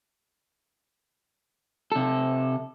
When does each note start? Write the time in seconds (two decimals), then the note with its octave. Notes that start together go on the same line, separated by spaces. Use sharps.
1.92 C3 A4